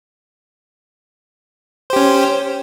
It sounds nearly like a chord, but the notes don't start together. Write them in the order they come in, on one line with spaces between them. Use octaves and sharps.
C5 G4 C#4